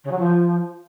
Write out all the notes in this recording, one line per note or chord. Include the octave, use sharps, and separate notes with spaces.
C#3
F#3
F3